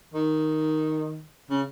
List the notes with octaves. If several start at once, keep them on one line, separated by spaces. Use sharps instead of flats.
D#3
C#3